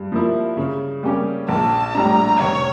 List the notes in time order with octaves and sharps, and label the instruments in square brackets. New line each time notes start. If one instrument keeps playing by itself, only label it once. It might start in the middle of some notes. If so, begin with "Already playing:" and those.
Already playing: [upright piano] G2
F3 A#3 E4
C#3
G3 A#3 C#4 G4
[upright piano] A#1 [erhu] A5
[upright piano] A2 G3 D4 [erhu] A#5
[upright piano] F1 [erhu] C#5